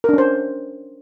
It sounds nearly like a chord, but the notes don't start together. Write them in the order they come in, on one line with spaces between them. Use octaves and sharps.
A#4 D4 C#4 C5